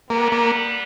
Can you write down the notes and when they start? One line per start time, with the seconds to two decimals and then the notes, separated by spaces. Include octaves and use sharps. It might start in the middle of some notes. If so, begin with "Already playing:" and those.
0.10 G3 A#3 B3
0.32 A#3